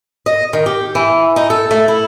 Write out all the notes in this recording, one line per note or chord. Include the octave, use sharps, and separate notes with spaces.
D#5
D#3
G4
E3
D#4
A4
A3
E4